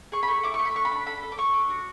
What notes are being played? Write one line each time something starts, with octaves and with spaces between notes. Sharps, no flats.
G#4 C#6
B5
A3 C#6
E4 D6
C#6
A3
B5
D4 C#6
B5
D4
A4 B5
A4
D6
A4 C#6
D4
F#4